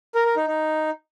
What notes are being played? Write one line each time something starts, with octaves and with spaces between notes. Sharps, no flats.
A#4
A#4
D#4
D#4